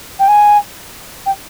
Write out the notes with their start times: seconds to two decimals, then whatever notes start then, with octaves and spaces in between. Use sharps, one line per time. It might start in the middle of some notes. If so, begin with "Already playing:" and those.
0.19 G5
0.28 G#5
1.26 G5